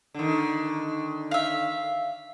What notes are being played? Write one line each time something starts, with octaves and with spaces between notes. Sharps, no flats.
D3 D#3
E5 F5